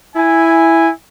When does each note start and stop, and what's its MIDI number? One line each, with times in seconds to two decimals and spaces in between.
0.16 0.89 64
0.16 0.89 80